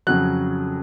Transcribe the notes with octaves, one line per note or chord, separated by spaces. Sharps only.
F2 C#3 F#3 F#6